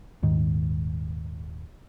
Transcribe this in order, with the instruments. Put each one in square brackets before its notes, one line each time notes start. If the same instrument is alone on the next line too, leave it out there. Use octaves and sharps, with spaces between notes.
[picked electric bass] D#1 G#2 D#3